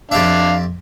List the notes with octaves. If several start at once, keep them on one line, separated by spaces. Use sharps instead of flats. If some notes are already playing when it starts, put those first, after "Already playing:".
F2 D4 G4 E5 F5